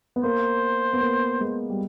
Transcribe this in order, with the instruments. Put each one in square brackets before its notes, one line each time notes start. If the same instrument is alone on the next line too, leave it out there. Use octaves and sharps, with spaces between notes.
[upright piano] B3
[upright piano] A#3 [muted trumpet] C5
[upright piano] B3
A#3
G#3
G3